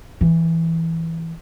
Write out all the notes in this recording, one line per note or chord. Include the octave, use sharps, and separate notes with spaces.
E3